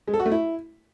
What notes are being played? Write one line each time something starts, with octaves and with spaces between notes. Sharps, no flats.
G#3
A4
F#4
A3
E4